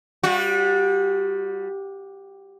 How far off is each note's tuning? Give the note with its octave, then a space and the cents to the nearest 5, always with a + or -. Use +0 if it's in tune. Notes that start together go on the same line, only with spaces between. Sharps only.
G3 +0 F#4 -30